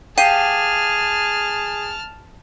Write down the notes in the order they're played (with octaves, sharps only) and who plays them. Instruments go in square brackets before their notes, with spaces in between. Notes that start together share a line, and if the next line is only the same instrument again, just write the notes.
[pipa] G4 [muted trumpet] G#4 [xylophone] F5 C7 D#7 [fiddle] A5 F6